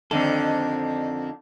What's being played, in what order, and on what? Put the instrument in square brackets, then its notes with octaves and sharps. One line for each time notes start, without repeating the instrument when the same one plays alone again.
[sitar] F2 D3 D#3 [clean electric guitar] C4 D4 A4